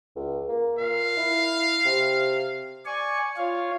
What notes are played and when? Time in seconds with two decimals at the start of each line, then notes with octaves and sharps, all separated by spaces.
0.16 C#2
0.49 A#3
0.79 A#2 F5
1.17 E4
1.85 C3
2.86 D5 G#5 C#6
3.37 F4 C#5 F5